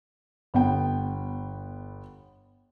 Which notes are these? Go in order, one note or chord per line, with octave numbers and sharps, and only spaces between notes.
G1 B3 G5